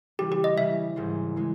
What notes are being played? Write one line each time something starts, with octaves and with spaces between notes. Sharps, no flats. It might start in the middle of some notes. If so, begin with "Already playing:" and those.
C#3 E3 G3 G4
G4
D#5
C#3 E3 G3 E5
G#1 G#2 E3 G#3
E3 G#3